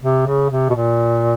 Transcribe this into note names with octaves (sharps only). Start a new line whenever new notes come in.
C3
C#3
C3
B2
A#2